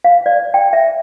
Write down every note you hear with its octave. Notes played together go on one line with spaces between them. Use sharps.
F5
D5
G5
E5